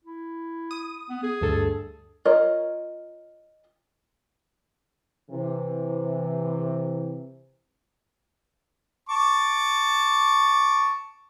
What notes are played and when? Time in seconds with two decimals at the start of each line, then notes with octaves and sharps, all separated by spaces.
0.04 E4
0.71 D#6
1.10 B3
1.23 G#4
1.41 D2 G2 A4
2.25 F4 A#4 C#5 D#5
5.31 C3 E3
9.09 A5 C#6 D6